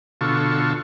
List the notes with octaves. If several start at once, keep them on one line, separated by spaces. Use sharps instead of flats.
B2 D3 F4 A4 C#6